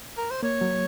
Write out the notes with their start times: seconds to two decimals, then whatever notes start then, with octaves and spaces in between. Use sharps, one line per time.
0.17 A#4
0.31 C5
0.43 A#3 C#5
0.61 F#3